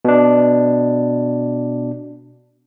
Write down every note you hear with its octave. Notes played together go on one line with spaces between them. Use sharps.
B2 D4